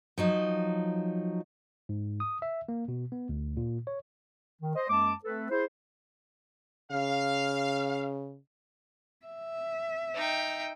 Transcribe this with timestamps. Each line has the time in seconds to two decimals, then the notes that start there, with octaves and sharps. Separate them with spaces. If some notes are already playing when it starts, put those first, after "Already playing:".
0.18 F3 F#3 D#4
1.89 G#2
2.20 D#6
2.42 E5
2.69 A#3
2.88 B2
3.12 B3
3.29 D2
3.57 A#2
3.87 C#5
4.62 D#3
4.76 C5 D#5
4.89 F#2 G#3 A#3 A5 D6
5.24 A3 C4 A4 B4
5.51 E4 G#4 C5
6.91 C#3 F5
9.26 E5
10.14 D#4 G5